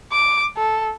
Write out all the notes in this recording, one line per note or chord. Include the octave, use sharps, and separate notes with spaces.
D6
A4